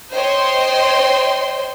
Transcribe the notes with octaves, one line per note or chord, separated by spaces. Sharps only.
C5 C#5 D#5 G5 C6